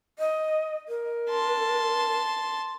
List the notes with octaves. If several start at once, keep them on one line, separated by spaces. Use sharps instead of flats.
D#5
A#4
A5 C6